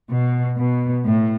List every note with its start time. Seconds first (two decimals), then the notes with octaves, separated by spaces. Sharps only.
0.10 B2
0.58 B2
1.06 A2